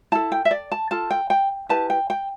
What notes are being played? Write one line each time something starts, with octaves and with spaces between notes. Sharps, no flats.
E4 A4 A5
G5
E5
D5
A5
F4 A4 A5
G5
G5
E4 G4 B4 A5
G5
G5